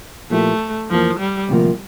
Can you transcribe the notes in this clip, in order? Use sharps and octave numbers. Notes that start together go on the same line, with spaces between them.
A#2 F3 A3 A#3 E4 G4
F2 E3 F3 A#3
G3
D2 C3 F3 A#3